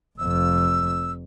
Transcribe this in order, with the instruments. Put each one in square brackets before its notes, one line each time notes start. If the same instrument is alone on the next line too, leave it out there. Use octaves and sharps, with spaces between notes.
[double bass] F1 F2 [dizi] E6